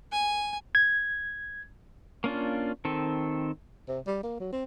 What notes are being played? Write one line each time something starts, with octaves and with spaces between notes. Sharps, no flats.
G#5
G#6
A#3 C#4 D4 F4
D#3 C4 A4
C3
G3
A#3
F#3
C4